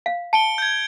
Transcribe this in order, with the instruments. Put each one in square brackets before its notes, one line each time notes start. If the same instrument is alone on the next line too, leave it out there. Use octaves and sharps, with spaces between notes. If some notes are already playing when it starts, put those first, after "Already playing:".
[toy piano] F5
[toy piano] A5 [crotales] C#7 D7 G7
[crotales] G6 G#6